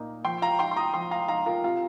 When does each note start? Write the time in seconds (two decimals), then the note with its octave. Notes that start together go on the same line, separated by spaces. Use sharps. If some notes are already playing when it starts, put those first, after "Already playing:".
Already playing: A#2 A#3 D#4
0.25 F3 G5 C6
0.42 F5 A#5
0.59 D#4 G5 C6
0.71 C6
0.76 A#5 D#6
0.94 F3 G5 C6
1.11 F5 A#5
1.28 D#4 F5 A#5
1.46 F4 A#4
1.63 C3 F4